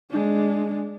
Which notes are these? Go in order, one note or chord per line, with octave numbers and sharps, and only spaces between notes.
G#3 D4